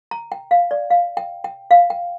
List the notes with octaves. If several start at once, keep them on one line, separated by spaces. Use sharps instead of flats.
A#5
G5
F5
D5
F5
G5
G5
F5
G5